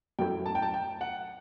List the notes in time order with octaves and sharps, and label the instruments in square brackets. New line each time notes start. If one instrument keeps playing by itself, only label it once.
[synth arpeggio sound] F#2 F#3 A3 E4 [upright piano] G5
[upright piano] A5
G5
A5
G5
F#5